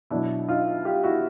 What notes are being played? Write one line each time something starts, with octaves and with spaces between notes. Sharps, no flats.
B2 F#3 D4 E4
D#4 F4
F4 G4
E4 F#4